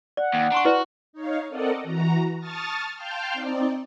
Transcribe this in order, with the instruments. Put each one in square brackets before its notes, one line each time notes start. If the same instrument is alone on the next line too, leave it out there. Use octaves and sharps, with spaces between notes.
[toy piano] D5 [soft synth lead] F#5
[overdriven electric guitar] D#2
[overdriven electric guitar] D4 [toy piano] A#5 C6 C#6
[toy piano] E4 B4 D5 [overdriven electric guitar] F#4
[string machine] D#4 C#5 F5
C4 A4 A#4 D5 D#5 F#5
E3 F#4 A#5
A5 C#6 D#6 F6 A6
F5 G5 A5 C6 F6 G6
C4 D#4 D5